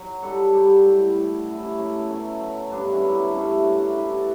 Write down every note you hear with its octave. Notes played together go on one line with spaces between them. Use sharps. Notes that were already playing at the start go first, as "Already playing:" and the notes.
Already playing: F#3
G3 F#4 A4
G3
A2
A2
F#2 E4 G4
C#4 E4
F#2 A3
B3
F#3 A3 C#4
F#3
G2 B3 D4
C#4 E4
F#3
B3 D4
G2 A3 C#4
A3
F#3
D4 F#4
A2 G4 B4
F#4 A4